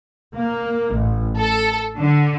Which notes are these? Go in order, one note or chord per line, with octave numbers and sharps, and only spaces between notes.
A#3
A1
A4
D3